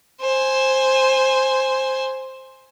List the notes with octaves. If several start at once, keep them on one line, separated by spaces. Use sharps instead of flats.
C5 G#5